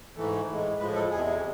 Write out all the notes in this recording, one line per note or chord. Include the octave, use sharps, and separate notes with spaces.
G#2 E3 A3
A2 G#3
A2 F3 G#3 B4
A4
E2 C3 G#3 G#4